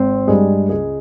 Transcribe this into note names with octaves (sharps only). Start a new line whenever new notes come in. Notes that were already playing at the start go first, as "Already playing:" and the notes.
Already playing: G#1 C4 C5
G2 G3 G#3 G#4
C#2 G#3 G#4